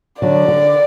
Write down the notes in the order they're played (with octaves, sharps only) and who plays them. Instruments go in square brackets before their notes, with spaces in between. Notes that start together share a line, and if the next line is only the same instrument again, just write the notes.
[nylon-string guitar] D3 F#3 [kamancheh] D5
[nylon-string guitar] D3